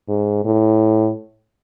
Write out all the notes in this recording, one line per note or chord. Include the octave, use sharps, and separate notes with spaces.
G#2
A2